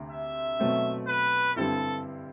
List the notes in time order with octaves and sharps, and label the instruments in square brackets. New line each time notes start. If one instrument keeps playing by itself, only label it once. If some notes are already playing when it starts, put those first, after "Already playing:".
Already playing: [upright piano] D2 C3
[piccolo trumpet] E5
[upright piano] B2 F#3 A3 C4
[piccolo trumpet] B4
[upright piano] G2 D3 G3 C4 E4 [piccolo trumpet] A4